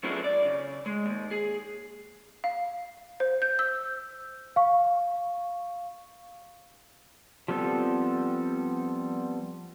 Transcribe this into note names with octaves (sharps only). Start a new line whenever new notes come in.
F#3 B3 C#4 E4 F4 G#4
D5
C#3
G#3
D#2
G#4
F5
C5
G6
E6
F5 C#6
F3 G3 B3 C4 A4